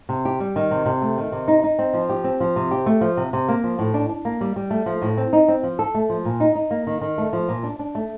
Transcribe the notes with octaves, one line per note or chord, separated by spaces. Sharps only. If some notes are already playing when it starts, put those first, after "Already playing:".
C3
G4
G3
D#3
C3
C3
A3
D#3
C3
D#4
D#4
C4
F3
G4
C4
F3
C3
G4
A3
F3
C3
C3
A#3
F3
A2
D4
D4
A#3
G3
G3
A3
F3
A2
C4
D#4
C4
F3
A4
A3
F3
A#2
D#4
D#4
A#3
D#3
D#3
A3
F3
A#2
D4
D4
A3